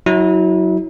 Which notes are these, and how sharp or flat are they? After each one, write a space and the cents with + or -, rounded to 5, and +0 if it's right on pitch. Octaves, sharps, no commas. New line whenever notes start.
F#3 +0 E4 -35